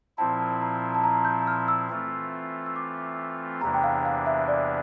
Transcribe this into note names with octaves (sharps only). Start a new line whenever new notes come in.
A#2 F3 C4 E4 A5
A#5
A5
A#5
G6
F6
E6
E3 A3 C4 F4
E6
D6
E2 C3 E3 A#3 D4 A#5
G5
F5
F5
E5
D5